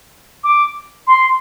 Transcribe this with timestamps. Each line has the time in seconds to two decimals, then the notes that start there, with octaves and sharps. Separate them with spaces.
0.44 D6
1.07 C6